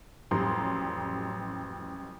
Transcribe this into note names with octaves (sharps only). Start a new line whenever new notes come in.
A1 F2 F#3 G3 A#5 C6